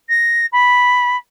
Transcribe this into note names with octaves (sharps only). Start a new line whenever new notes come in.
A#6
B5